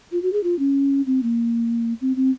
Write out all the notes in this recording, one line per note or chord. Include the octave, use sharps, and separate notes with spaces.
F4
F#4
G#4
F4
C#4
C4
A#3
C4
C4